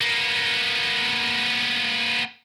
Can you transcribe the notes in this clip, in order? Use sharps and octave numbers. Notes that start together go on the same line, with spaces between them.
A#3 B3